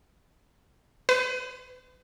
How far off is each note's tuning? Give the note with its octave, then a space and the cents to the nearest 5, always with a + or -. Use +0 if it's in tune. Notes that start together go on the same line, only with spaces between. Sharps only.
B4 +35